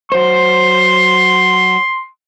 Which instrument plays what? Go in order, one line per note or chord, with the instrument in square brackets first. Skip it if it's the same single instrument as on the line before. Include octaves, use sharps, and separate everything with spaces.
[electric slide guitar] F#3 C5 [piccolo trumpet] C6